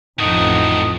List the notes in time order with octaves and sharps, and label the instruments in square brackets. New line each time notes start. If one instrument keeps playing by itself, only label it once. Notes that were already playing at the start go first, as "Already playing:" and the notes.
[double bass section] A1 F2 [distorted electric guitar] A2 F#4 [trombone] D#4 [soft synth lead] D#6